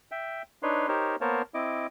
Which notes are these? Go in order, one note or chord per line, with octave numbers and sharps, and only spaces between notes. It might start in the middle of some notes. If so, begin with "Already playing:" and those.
E5 G5
D4 D#4 B4 C#5 C6
D#4 G4 A#4 C5 C#5
A#3 B3 A#4 C5 C#5 A5
C4 E4 D#5 D6